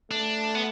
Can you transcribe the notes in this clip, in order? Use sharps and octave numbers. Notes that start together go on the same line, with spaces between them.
A3 D4
B3